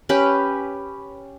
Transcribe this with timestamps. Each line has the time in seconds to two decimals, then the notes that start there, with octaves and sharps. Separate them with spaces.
0.09 C#4 G4 B4 B5